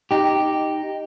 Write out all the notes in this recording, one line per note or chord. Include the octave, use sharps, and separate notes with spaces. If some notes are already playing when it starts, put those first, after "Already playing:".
D#4 G4